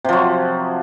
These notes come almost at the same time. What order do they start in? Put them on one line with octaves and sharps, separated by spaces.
C3 F3 F#3